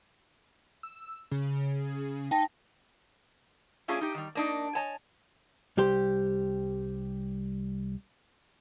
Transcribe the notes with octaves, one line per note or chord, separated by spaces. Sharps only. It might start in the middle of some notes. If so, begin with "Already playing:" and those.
E6
C#3
D#4 G5 A5 A#6
A3 C#4 D4 F4 G#4
D#4 G4
D#3 G3
A#3 D4 D#4
C#5 D#5 G#5 A5
C2 G3 G4 C5